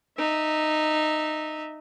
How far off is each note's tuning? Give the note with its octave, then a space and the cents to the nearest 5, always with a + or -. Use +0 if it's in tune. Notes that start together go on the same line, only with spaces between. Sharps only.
D#4 -15 E5 -20